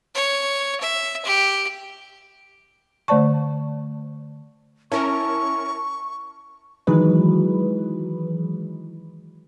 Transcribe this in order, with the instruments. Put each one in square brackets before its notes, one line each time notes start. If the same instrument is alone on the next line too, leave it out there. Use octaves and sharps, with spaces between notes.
[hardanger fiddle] C#5
E5
G4
[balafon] D3 A3 C5 D5 A5 C#6
[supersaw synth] C#4 A#4 [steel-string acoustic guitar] E4 A5 [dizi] C#6
[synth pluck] D#3 E3 F#3 G#3 B4